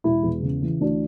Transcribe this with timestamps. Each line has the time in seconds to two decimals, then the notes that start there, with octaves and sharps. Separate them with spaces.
0.04 E1 E4
0.23 E2
0.42 C#3
0.62 E3
0.81 D2 D4